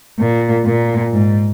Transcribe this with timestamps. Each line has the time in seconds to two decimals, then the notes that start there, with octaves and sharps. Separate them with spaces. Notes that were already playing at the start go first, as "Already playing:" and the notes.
0.19 A#2
0.65 A#2
1.13 G#2